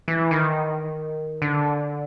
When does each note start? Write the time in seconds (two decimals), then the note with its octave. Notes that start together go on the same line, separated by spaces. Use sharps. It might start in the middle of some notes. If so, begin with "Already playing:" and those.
0.08 E3
0.31 D#3
1.42 D3